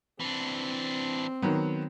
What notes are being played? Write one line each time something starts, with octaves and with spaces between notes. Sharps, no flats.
E3 C4 D4
D#3 F#3 B3